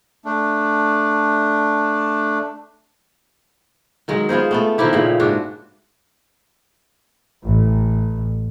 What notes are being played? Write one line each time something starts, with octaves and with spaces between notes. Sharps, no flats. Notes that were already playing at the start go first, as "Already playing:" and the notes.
A3 D4
D#3 F#3 G#3
B3 F4 G#4 C5
A3 B3 A4
D#3 F3 E4 G4
A#2 C#3
G#2 D4 F#4
A1